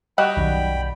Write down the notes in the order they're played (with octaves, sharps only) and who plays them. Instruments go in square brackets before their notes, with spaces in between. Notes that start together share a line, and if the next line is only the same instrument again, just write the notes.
[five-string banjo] G3 F#4 D#5 [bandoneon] G5 B5
[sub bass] B1 [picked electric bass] F#2 D#3